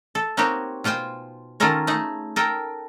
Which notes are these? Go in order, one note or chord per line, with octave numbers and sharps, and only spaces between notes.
A4
A#3 C4 D#4 F#4 G4 C#5
B2 F4 C5 G5 G#5
D#3 C#4 F4 A4 A#4 C#5
A3 D#4 G#4
A4 A#4 G5